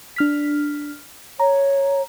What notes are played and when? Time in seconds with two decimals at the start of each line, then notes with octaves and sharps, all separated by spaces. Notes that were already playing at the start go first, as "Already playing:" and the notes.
0.16 D4 F6 B6
1.40 C#5 A#5